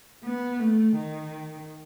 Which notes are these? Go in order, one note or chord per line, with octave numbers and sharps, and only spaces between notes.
B3
A3
D#3